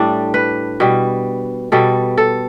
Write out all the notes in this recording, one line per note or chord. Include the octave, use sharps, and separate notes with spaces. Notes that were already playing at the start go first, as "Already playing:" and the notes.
Already playing: A2 G3 D4
B4
B2 G3
B2 G3 A4
A4